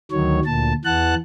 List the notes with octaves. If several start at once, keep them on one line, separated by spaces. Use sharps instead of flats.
D2 D#3 F#3 C#5
D2 A#2 A5
E2 E3 F#5 A5 F#6